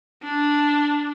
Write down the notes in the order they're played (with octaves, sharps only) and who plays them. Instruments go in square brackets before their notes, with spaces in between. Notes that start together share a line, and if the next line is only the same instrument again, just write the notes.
[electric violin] D4